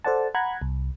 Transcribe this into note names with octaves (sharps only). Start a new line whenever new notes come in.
A4 C5 D5 F#5 A5
F#5 A#5 B5 F#6 G#6
C2